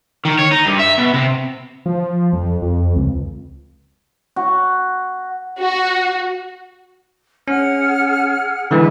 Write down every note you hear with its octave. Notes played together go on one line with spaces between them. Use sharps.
D#3
C#5
D#4
G2
E5
B2
C3
F3
F2
F2
C#2
F#4
F#4
C#4 G#4 F#5 F6
D3 E3 G#3 B4 E5